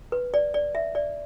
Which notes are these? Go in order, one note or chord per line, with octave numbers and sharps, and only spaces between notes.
B4
D5
D5
E5
D5